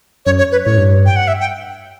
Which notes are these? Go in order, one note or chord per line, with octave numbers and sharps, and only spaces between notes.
F#2 C#5
C#5
B4
A2 C#5
G2
G5
F#5
E5
G5